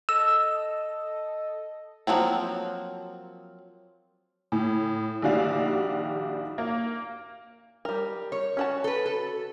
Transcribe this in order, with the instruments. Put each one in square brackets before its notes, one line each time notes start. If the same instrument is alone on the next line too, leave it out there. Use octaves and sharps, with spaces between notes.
[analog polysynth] A4 D#5 [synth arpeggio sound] E6
[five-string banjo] F3 F#3 A#3 C4
[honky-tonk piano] A2
A#1 D#3 G3 D4 F#4 F5
A#3
[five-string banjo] G3 A#4
[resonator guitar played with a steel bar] C#5
[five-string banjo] C#4 F#4 A5
[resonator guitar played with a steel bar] A4 B4
A4